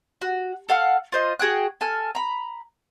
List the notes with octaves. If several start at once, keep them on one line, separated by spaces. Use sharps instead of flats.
F#4
A4 F5 F#5 F6
F4 C5 D#5
F#4 G#4 G5 F#6
A4 G#5 F6
A#5 B5